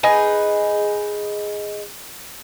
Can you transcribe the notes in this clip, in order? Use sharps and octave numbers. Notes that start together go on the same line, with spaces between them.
D#4 G#4 B4